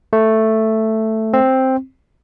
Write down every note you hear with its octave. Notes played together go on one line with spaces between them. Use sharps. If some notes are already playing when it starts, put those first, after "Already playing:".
A3
C4